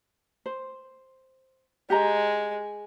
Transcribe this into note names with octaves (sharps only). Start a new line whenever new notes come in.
C5
G#3 G4 D#5 A#5